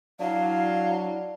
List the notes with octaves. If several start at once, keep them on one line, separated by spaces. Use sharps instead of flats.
F#3 D4 E4 F5